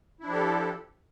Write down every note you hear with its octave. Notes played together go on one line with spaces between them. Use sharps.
F3 D4 E4 G4 A4